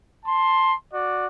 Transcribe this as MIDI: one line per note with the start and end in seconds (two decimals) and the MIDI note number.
0.25 0.74 81
0.25 0.74 84
0.92 1.25 66
0.92 1.25 74